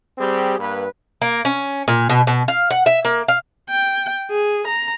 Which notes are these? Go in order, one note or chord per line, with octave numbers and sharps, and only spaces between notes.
G3 C4 G4 G#4
G2 A#3 B4
A#3
C#4
A#2
B2
B2
F5
F#5
E5
A#3
F5
G5
G#4
A#5